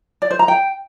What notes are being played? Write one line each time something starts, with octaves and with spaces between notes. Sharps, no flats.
D5
C5
A#5
G5